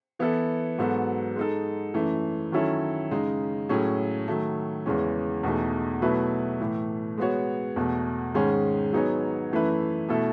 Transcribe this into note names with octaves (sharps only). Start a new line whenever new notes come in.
E3 B3 E4 A4
G#2 F#3 B3 F#4 A4
G#3 D#4 A4
F#2 E3 A3
D#3 F#3 C#4 E4 A4
F#2 C#3 G#3 D#4
A2 F#3 C#4 G#4
D#3 F#3 A3
E2 C#3 E3 G#3 C#4
E2 B2 A3 D#4 G#4
B2 F#3 A3 E4 B4
A2 E3 A3
G#3 B3 F#4 C#5
E2 B2 A3
G#2 D#3 G#3 C#4 G#4
F#3 B3 D#4 G#4 C#5
F#2 E3 A3 E4 B4
B2 A3 E4 A4